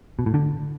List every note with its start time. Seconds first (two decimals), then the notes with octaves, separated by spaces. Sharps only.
0.19 B2
0.26 A2
0.34 D3